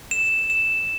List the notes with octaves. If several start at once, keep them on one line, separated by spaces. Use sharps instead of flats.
E7
E7